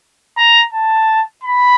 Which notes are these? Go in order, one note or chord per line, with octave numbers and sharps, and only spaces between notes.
A#5
A5
B5